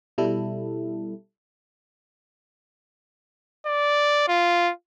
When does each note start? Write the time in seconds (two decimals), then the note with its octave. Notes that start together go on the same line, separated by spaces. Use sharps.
0.18 B2 G3 E4 A4
3.66 D5
4.28 F4